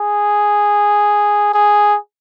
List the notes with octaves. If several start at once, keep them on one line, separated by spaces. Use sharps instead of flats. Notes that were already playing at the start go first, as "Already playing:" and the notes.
Already playing: G#4
G#4